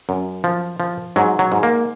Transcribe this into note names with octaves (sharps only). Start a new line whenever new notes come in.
F#2
F3
F3
G#2 F#3
F#3
G#2
A#3